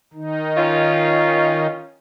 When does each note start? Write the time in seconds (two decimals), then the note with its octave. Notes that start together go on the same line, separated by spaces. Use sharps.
0.13 D#3 D#4
0.57 C#4 F4